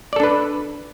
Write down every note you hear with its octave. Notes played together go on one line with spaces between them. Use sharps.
D4 A4 B4 D5